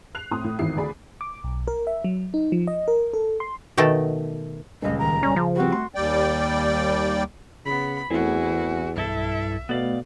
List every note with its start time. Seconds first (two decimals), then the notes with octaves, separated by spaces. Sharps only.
0.15 F#6 C7 F7
0.31 A2 C4 C6 D#6
0.44 A2
0.59 G#1 E2 D#3 E4 C7
0.77 D2 G#4 D5 G#5 B5
1.21 D6
1.44 B1
1.68 A#4
1.87 E5
2.04 F#3
2.34 D#4
2.52 F3
2.67 D#5
2.88 A#4
3.14 A4
3.40 C6
3.77 B2 D#3 A3 A4
4.82 D#1 C#2 D#5
4.98 D#3 A#5
5.23 G3 C#4
5.36 C#3 F3
5.56 G3 C4 F#4
5.72 A3 C6
5.95 D#2 G3 D5 G5
7.65 C#3 B3 B5
8.10 E2 E3 A3 C4 E4 F#4 G#4
8.96 B1 G2 E4 A4 E5
9.69 B2 A3 B3 D5 F5